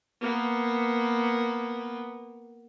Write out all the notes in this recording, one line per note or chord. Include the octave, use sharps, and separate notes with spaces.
A#3 B3